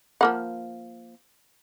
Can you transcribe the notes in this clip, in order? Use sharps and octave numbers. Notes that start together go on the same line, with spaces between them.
F3 A#3 F#5